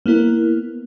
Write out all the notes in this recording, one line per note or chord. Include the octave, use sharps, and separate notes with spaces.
A#3 B3 E4 A#4